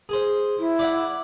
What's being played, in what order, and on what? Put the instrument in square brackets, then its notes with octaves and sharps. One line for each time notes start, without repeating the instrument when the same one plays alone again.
[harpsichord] G#4 C5
[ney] E4
[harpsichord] D5 E5 F#5